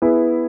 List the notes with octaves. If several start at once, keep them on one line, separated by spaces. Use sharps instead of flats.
B3 E4 G#4 B4